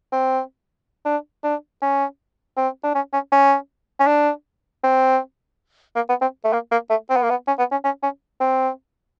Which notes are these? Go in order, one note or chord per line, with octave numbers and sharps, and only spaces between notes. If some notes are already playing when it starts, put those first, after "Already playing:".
C4
D4
D4
C#4
C4
D4
C#4
C#4
C#4
C#4
D4
C4
A#3
B3
C4
A3
A#3
A#3
A3
C4
B3
A#3
B3
C#4
B3
C#4
C#4
C#4
C4